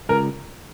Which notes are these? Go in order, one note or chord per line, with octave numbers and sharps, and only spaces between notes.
C#2 A#4